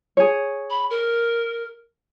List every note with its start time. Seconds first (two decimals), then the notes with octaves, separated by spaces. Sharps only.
0.17 G#4 C#5
0.70 B5
0.90 A#4